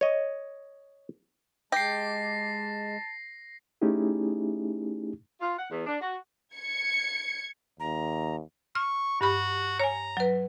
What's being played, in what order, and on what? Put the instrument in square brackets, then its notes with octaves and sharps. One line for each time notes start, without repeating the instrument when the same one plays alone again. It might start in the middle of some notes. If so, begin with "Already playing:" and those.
[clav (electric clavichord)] C#5 D#5
[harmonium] G#3 [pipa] G4 [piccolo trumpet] A5 [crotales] A#6 C7
[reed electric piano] A3 C#4 D#4 E4 G4 G#4
[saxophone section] F4
F#5
E2
D4
F#4
[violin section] G#6 C#7
[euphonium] D#2 [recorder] A#5
[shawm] C#6 [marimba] F6
[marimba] G2 G4 B5 [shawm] F#4
[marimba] C#5 G#5 [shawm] A#5
[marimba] F#3 B4